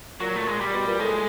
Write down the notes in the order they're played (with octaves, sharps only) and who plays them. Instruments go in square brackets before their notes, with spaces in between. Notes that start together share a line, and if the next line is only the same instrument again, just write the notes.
[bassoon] A#2 [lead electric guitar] F#3
[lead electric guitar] A3
G#3
G3
[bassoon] B2
A#2
[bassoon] A2 [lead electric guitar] G#3